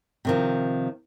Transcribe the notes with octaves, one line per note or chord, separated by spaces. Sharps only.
C3 D#3 F3